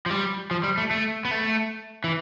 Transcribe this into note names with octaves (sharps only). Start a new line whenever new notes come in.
F3
G3
F3
G3
A3
A3
B3
A3
E3